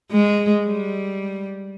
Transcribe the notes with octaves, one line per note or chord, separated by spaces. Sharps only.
G#3
G3